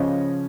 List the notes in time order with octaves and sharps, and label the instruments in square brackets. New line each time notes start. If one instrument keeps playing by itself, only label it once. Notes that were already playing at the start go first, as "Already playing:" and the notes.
Already playing: [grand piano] C#3 F3 C#4 D#5